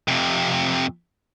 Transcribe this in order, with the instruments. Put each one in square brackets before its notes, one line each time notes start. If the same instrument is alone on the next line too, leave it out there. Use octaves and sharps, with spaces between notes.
[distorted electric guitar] F2 C3